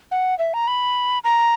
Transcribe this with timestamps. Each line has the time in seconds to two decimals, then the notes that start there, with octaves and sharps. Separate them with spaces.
0.11 F#5
0.39 E5
0.54 A#5
0.68 B5
1.24 A#5